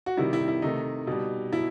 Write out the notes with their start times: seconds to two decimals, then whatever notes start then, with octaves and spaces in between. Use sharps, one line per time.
0.06 F#4
0.17 C3 D#3 G3 E4
0.33 E4
0.48 E4
0.62 C3 D#3 A3 D#4
1.07 B2 G3
1.52 B2 F#3 E4